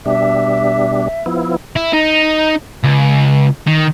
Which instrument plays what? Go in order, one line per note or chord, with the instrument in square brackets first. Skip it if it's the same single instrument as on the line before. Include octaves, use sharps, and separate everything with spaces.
[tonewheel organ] B2 G3 D4 [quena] E5
[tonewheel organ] F3 B3 E4
[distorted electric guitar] E4
D#4
C#2
D#3